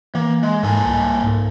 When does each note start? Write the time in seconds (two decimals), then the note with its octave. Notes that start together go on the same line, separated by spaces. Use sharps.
0.15 E3 A#3
0.43 G#3
0.63 G#2 A#3 A4 G#5
0.85 C2
1.24 G#2